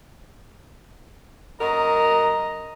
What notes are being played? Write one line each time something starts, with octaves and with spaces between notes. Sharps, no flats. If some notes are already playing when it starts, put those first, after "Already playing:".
F#2 F#4 A#4 D#5 A#5